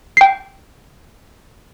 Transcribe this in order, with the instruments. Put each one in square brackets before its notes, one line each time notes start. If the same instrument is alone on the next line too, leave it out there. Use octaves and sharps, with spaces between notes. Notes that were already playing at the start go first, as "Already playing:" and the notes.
[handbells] G5 C7